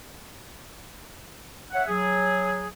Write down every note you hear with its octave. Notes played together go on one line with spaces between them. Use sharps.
C#5 E5 F#5
F#3 G#4